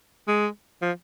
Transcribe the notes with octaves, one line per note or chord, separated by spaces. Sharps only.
G#3
F3